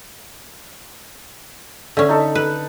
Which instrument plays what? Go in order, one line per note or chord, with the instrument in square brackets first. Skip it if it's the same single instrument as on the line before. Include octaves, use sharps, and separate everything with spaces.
[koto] D3 C#4 [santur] E5
[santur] D#4 A4
[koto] B4